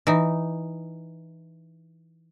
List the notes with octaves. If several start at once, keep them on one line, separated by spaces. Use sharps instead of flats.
E3 D#4